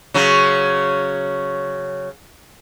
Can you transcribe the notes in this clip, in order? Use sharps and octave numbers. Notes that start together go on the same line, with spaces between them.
C#3 F#3